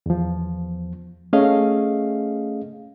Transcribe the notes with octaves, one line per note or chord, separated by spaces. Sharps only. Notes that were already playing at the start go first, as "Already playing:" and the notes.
E2 F3
A3 C#4 G#4 D#5 F5